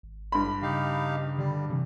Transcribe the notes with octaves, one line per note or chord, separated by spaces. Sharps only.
G#1
G2 B5
C#3 D#4 G4 F5
D3 G3
C3 E3 G3